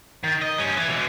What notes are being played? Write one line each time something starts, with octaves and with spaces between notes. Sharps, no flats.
D#3
D#5
G2 C#4
E3
B2 E3